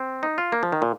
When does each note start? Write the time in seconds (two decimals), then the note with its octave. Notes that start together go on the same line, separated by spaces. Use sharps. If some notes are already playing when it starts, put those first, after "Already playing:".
Already playing: C4
0.23 D#4
0.38 F4
0.52 A#3
0.63 F3
0.72 D#3
0.82 A#2